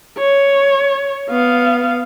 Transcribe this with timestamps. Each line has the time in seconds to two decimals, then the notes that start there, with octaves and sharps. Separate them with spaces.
0.18 C#5
1.30 B3 F5